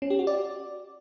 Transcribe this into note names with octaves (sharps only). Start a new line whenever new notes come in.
C#4
G4
F#4
D5